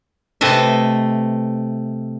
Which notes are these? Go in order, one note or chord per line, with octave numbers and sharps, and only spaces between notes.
C3 A3 B4 D#5 E5